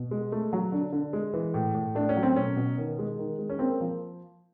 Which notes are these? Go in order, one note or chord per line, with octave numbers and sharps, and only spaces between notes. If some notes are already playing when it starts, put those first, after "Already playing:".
Already playing: B2
G#3
A3
F#3
D3
D3
G#3
E3
A2
A2
A3 D4
C#4
F#3
C4
B2 C#4
B2
D#3
G#3
D#3
G#3
C#4
A#3 C4
F3